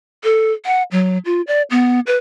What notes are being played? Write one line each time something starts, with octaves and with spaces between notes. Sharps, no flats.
A4
F#5
F#3
F4
D5
B3
B4